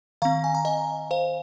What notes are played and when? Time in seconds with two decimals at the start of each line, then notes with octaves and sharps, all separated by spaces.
0.22 D#3 C4 F5 A#5
0.44 G#5
0.55 A#5
0.65 D#5 G#5
1.11 C5 F5